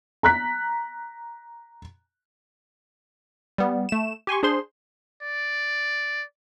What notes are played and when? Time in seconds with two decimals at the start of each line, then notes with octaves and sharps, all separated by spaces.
0.23 A#5 F#6 B6
3.58 G3 B3
3.89 A3 E7
4.27 G4 G#5 C6 C#6
4.43 D4 G#4 C5 C6
5.22 D5